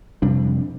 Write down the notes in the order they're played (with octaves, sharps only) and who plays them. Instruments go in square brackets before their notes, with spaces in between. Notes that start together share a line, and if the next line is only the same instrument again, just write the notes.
[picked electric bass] F2 C3 G3 D4